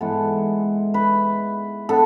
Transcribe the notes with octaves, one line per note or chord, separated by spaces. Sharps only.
G#2 E3 G#3 B3 A4
B4
B3 D4 A4